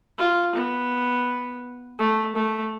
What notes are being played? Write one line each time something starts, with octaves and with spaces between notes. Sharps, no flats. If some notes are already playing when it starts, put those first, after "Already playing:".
F4
B3
A3
A3